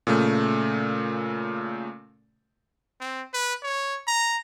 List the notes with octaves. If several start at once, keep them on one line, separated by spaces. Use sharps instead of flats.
A#2 C#3 A3
C4
B4
C#5
A#5